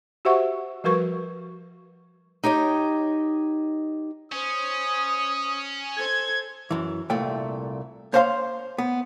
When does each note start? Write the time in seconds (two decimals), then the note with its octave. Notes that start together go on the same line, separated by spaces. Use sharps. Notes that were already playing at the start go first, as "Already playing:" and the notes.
0.25 F#4 G4 C5 E5 F#5 C#6
0.84 F3 G3 F#4 A#4 B4 C#6
2.44 D#4 G4 C#5 D#5
4.32 C#4 C5 D#6
5.97 A4 C5 G#6
6.71 F#2 E3
7.10 C2 A#2 A3 G5
8.13 A#3 C5 C#5 F5 A5 C6
8.78 B3